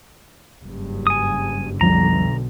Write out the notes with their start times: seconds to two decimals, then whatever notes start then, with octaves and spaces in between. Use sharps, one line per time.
0.62 F#1 G2
1.07 G#5 D#6
1.81 B1 F2 D3 F3 G3 A#5